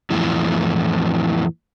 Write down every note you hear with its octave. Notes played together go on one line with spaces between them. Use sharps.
F2 A2 E3